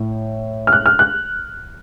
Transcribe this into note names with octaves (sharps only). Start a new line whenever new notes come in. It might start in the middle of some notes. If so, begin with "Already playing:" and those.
Already playing: A2
F6
F#6
F6
F#6